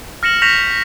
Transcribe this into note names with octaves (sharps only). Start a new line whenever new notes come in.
F6 A#6 C#7 E7 F#7
C#6 G6 A#6 B6 E7 F7